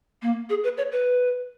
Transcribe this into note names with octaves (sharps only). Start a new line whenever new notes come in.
A#3
G#4
B4
C#5
B4